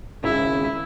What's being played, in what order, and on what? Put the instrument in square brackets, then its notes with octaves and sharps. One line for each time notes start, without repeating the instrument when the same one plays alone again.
[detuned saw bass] G#1 [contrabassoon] C#3 [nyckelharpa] E4